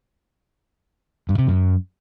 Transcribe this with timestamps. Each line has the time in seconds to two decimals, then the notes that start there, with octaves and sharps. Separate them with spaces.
1.29 G2
1.38 C3
1.48 F#2